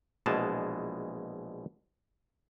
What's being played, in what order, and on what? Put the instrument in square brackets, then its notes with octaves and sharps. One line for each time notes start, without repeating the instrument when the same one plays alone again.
[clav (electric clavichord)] A#1 B2 E3 G#3 A5